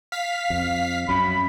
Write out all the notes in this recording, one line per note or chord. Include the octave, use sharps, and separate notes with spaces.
F5 B6
F2
F#2 B5